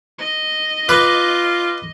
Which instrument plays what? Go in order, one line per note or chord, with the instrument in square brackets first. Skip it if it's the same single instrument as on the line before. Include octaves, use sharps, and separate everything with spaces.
[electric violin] D#5
[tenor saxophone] F4 [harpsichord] B4 [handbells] D6